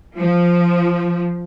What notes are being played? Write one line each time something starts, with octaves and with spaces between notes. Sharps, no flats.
F3